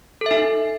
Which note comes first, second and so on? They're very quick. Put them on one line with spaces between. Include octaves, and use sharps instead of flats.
A4 E5 D#4